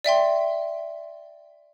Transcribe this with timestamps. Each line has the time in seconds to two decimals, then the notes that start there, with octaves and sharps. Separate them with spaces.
0.04 D5 E5 G5 C6